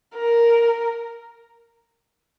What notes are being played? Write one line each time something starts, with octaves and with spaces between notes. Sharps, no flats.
A#4